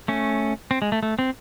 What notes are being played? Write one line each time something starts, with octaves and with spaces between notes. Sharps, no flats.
A3 C#4
C4
G#3
A3
A3
C4